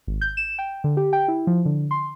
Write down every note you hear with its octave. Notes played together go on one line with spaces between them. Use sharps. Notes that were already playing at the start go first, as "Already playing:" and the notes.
G#1
G6
E7
G5
D3
G4
G5
E4
F3
D3
C6